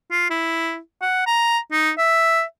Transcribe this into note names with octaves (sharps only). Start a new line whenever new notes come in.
F4
E4
F#5
A#5
D#4
E5